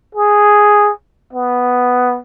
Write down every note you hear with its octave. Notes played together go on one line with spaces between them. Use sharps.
G#4
B3